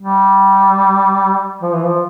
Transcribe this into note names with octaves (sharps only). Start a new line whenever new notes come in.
G3
F3
E3
F3